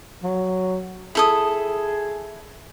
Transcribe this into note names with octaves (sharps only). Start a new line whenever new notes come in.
F#3
E4 G#4 A4 D#6